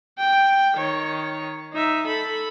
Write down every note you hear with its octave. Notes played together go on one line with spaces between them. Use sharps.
G5
D#3 C#5
D#4 E5
A4 B5